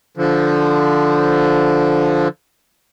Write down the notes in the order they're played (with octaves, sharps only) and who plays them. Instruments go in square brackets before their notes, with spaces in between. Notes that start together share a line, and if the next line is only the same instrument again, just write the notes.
[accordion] D3 F3